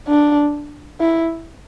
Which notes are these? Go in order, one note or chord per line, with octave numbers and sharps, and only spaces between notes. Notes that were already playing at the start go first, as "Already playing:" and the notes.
D4
E4